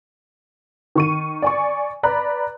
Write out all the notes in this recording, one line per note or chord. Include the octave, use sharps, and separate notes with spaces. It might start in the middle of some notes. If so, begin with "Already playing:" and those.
D#3 C#6 D#7
D5 G#5 C#6
B4 D5 A#5 B5 F#6